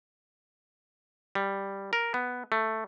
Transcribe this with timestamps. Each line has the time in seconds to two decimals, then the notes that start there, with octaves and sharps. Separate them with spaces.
1.35 G3
1.93 A#4
2.14 B3
2.52 A3